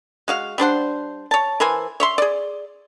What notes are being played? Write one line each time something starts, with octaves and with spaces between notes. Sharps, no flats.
G#3 F#4 F5
G3 D4 C5 F#5
C#5 A5
E3 A#4 C5 G#5
C#5 E5 C6
G#4 D5